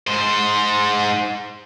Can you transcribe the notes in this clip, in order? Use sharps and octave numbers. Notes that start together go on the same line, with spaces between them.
G#2 C5